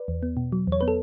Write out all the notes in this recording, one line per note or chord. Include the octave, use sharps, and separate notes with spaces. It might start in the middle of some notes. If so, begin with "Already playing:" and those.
Already playing: B4 D5
E2
B3
B2
F#3
E2 C#5
B3 B4
A4